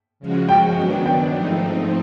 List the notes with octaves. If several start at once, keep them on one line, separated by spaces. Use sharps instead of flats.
C#3 F3 G#3 C#4 F#4
G5
D#3 F#3 B3 D4
G5
G#2 F3 A3 C4 D#4